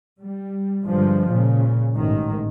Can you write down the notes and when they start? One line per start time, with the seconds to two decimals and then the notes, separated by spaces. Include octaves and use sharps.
0.20 G3
0.85 G2 D3 F3 G#3
1.29 A#2 C#3
1.95 A1 G#2 D#3